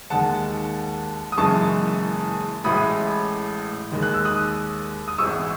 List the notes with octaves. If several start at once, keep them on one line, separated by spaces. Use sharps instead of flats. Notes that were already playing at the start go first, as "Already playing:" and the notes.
D#2 D#3 G#3 F#5 A5
D#6
F#1 F#2 C#3 E3 G#3 A5 C#6
A1 A2 E3 G#3 B5 D#6
D#2 D#3 G#3
F#6
E6
D#6 F#6
D#6
G#1 G#2 E3 G#3 C#6 E6